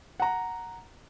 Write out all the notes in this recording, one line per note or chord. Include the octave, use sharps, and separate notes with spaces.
F#5 A#5